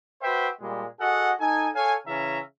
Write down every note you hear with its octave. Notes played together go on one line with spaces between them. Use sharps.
F#4 B4 C5 E5 G5
A#2 G3 G#3
F#4 G#4 A4 D#5 F#5
D#4 A4 G#5
A4 C#5 F5 G#5
C#3 E3 C#4 E5 A#5